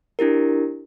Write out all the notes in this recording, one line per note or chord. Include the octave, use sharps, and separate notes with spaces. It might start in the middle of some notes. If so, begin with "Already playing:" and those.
D4 E4 G4 A#4